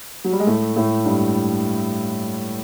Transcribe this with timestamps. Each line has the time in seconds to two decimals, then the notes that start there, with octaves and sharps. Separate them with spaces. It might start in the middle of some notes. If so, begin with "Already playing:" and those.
0.24 F#3
0.32 G3
0.40 G#3
0.47 A2 A3
0.76 A2 A3
1.05 G2 G3